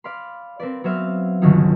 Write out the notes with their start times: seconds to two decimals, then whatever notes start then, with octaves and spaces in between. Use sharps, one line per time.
0.04 D5 F5 B5 C6
0.59 C4 A#4 B4 D5
0.84 F#3 B3 C4 C5 E5 F5
1.42 G1 C#2 D3 D#3 F#3 D#4